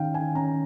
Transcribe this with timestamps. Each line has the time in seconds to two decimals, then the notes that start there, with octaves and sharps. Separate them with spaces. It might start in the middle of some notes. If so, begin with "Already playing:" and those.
Already playing: D#3 C#4 F5 G5
0.14 G#5
0.35 C#4 A#5